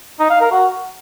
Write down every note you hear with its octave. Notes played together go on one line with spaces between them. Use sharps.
D#4
F5
A#4
F#4